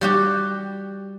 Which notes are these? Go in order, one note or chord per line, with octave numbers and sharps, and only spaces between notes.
G3 F#4 G4